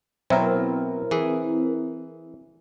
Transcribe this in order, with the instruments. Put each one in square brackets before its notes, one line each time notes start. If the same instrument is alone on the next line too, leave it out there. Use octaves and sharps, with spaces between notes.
[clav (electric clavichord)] B2 F#3 [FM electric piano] C4 E4 A#4
[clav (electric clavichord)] E3 G#4